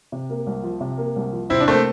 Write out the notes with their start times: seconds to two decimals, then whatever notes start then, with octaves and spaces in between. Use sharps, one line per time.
0.12 C3
0.30 A#3
0.47 C2
0.63 F3
0.81 C3
0.98 A#3
1.16 C2
1.32 F3
1.50 C3 C4 E4
1.60 D4
1.68 A3 A#3 C4